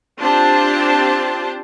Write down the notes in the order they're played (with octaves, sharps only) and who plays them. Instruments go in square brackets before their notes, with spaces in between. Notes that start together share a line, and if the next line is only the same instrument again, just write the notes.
[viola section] C4 D4 F4 G4 C5 A5